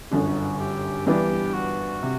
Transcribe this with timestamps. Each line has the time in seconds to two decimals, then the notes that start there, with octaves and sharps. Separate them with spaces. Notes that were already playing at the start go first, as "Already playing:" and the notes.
0.11 G1 F#2 D3 F#4
0.59 G4
1.07 G2 E3 B3 D4 G4
1.54 F#4
2.03 C3